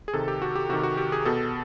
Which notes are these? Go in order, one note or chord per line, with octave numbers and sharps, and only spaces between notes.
G#4
C3 D#3 A4
G4
F#4
G4
C3 D#3 F#4
F#4
G4
G#4
B2 A4